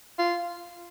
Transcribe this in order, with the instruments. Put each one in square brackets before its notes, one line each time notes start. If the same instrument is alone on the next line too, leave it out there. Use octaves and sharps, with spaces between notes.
[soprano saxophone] F4